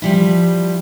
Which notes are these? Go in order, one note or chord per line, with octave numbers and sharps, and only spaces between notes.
F3 G3 E4